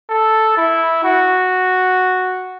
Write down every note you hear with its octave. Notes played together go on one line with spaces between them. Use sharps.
A4
E4
F#4